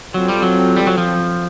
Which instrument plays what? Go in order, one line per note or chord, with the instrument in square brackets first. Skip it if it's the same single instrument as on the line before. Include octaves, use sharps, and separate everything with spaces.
[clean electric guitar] F#3 [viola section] C4 F4 A4
[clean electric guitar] G3
F#3
G3
F#3
F3